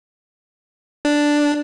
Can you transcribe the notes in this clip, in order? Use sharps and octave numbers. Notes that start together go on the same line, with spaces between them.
D4